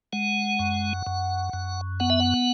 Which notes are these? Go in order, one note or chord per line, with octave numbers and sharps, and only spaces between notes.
G#3 F#5
F#2
F#2
F#2
B3 F#5
E5
F#5